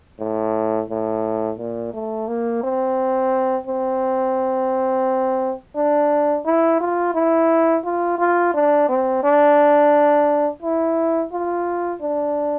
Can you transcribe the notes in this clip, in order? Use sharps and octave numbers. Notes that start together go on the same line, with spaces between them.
A2
A2
A#2
A3
A#3
C4
C4
D4
E4
F4
E4
F4
F4
D4
C4
D4
E4
F4
D4